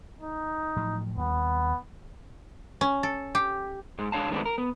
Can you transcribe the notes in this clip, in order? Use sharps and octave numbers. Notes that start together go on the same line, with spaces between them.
D#4
A2 F3 F#3
D#2 G3 B3
C#4
A4
G4
G#2 G#3
G#2 G#3 D4 C#5 F5 A5
D#3 G#3 A3 B3 C4 D4
A#4
B3